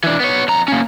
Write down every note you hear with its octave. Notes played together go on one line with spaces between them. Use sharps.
E3 D4
B3 C#5
F2 A#5
A#3 C#4